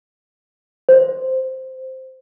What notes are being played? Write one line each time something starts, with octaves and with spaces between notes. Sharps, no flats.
C5